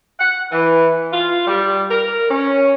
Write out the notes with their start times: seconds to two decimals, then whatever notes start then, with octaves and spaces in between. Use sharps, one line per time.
0.20 F#5
0.51 E3
1.12 F4
1.47 G3
1.91 A#4
2.31 C#4